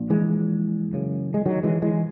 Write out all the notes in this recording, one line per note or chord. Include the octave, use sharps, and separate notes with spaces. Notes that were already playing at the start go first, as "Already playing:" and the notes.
Already playing: A#1 A#2
E3 G#3
F#1 F#2 C#3
G#3
D#3 F#3
E3 G#3
E3 G#3